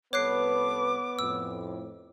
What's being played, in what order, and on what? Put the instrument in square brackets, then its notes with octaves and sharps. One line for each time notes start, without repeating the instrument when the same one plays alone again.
[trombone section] C2 A4 B4 [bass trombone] B3 [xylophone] C#5 F#6 C7 [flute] D6
[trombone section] F2 A2 [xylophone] E6